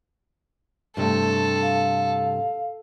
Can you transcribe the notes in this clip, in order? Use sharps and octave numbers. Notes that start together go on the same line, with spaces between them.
G2 C3 A3 A4
F5